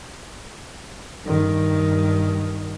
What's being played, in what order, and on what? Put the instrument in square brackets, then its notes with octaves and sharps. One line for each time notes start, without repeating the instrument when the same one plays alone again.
[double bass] G2 D#3